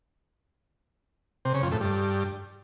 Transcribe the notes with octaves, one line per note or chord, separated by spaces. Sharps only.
C3
C#3
F2
A2
G2